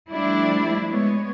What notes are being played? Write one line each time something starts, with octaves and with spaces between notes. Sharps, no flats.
F3 G3 A3 D4 E4
G#3 B3 C#5